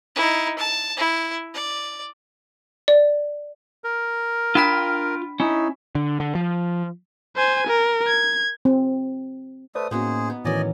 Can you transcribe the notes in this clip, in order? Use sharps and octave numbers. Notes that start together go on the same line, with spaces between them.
D#4 E4
A5
E4
D5
D5
A#4
D4 F4 G5 B5 F6 B6
C#4 D#4 E4
D3
D3
F3
C5 G#5
A#4
G#6
C4
A3 B4 C5 D5 D#6
A2 A#3 B3 C#4 D#4 F#4 G#4 C5
B3
A2 D#3 E3 F#3 C#4 D5 D#5 G#5